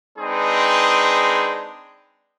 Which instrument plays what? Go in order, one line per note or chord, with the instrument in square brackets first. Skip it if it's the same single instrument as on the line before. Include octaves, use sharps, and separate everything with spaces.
[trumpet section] G#3 C4 D4 D#4 G#4 B4